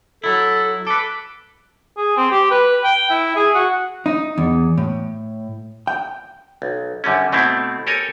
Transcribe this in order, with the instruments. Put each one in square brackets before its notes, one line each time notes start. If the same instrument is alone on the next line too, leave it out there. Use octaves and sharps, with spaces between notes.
[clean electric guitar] F#3 E4 [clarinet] A4
[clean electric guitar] A4 B4 [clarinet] D6
[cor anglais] G#4
C4
G4
B4
G5
E4
G#4
F#4
[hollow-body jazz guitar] D#4
E2
A2
G5
[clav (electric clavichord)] B1
F#2 D3 G3 C#4
B2 A3 C4 E4
G4 A4 A#4 C#5 G#5